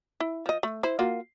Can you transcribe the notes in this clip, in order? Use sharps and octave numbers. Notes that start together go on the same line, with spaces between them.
E4
F3 D#5
A3
E4 C5
A#3 F4 F#4